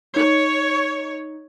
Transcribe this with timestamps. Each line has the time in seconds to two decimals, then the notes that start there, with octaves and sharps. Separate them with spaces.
0.16 D#4 C#5